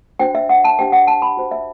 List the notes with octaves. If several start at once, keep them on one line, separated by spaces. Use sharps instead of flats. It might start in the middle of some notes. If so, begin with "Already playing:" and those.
D4 F#4 C5 G5
E5
F#5
A5
D4 G4 C5 G5
F#5
A5
B5
F#4 C5
E5